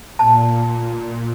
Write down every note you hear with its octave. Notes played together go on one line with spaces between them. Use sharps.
A#2 A5